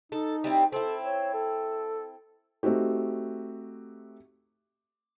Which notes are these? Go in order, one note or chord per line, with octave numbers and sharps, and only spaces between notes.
D#4 A4
G3 C4 E4
C4 E4 A4
C#5
A4
A3 C4 D#4 F#4 G4